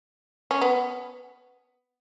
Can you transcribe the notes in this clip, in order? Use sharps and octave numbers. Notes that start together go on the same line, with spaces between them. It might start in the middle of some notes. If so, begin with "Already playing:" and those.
C#4
B3